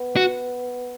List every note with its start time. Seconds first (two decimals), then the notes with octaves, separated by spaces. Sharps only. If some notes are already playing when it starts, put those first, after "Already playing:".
Already playing: B3
0.16 F#4